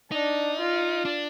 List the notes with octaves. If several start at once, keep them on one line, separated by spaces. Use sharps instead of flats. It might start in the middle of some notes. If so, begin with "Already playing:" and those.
D4 D#4
F4
D4